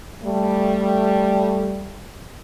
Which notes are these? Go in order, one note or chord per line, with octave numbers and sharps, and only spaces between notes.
G3 A3